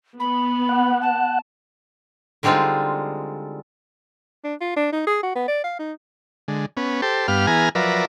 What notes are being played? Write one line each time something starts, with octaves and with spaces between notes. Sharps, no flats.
B3 B5
F#5
A5
D3 G3 G#3 C4 D#4 F4
D4
F4
D4
D#4
G#4
F#4
B3
D5
F5
D#4
D3 G#3
B3 C#4
G4 A4 C5
G2 B3 G4 F5 F6
E3 B3 G#4 G#5 A#5 F6
F3 F#3 A#4 B4 D5 E5